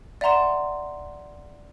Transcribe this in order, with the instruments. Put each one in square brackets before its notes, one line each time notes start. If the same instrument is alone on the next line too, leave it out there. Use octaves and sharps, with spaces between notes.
[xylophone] D5 E5 F#5 A#5 C6 E7